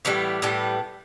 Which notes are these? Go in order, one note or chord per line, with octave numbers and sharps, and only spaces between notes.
A2 E3 G3 B3
A2 E3 G3 B3